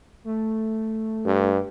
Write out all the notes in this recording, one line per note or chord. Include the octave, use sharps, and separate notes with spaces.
A3
G2